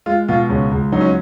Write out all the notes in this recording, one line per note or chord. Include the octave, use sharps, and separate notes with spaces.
G#3 F4
B2 F4
C#2 C#4
C#2
F#3 D#4
C#4